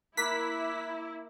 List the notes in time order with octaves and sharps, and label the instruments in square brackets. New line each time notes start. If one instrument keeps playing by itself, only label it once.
[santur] A#3 [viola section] E4 [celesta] B5 D6 F#6 [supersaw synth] B6